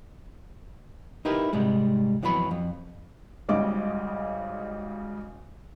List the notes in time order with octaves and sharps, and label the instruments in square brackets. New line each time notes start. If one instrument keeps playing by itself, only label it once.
[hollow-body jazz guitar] D#4 E4 G4 A#4 B4
G#2 C3 G3 G#3
F2 E3 F#3 B3 B5
F2
[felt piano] G#1 G#2 C#3 G3 D#5 D6